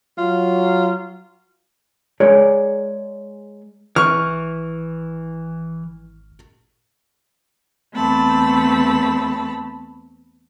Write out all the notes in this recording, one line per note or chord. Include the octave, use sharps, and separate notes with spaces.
F#3 F4
G#3 G#4 A#4 C#5 D5
G#1 E3 C#6 F6
E2 A3 C4 A5 B5